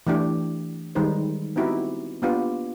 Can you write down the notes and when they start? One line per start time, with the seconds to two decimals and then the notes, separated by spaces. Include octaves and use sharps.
0.07 E3 A3 D4 G4
0.95 D#3 G3 G#3 D#4 B4 C5
1.56 B3 C4 D#4 E4 F#4 G4
2.22 A#3 B3 D4 F4 G4